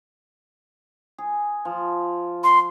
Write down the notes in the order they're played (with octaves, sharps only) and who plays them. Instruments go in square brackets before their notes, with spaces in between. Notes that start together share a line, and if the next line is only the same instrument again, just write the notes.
[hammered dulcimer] G#4
F3
[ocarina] C6